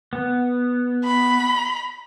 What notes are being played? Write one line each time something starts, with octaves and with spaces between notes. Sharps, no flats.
B3
B5